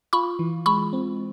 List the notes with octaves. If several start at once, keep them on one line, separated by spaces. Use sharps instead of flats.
F4 B5 C#6
E3
G#3 B5 C#6
C4